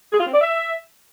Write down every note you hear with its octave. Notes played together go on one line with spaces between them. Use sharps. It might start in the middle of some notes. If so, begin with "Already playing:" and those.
G#4
F4
C4
D5
E5